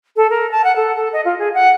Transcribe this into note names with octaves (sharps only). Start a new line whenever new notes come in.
A4
A#4
A5
F#5
A4
A4
D#5
F4
G#4
F#5